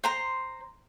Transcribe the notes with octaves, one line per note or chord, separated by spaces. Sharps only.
C5 A#5 C6